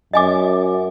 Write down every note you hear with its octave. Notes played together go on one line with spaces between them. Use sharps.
F#2 D#5 G#5 D6